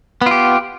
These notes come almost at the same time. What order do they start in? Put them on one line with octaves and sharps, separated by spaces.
B3 F4 G4